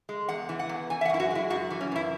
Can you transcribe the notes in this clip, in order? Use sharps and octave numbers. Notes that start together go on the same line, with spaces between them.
G#3
E2 F#5
E3
F#5
E2
E3 G#5
E5
F#5
F#2 E4
F#4
G#3 E4
F#2 F#4
E3
C#4
F#2 E4